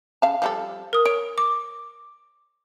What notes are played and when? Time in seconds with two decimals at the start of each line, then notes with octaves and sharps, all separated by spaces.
0.22 C#3 F5 A5
0.42 F3 G3 A4
0.93 A#4 D#6
1.06 C#5 D7
1.38 D6